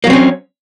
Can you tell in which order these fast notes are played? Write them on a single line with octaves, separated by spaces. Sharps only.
A#3 F#3 C4 C#4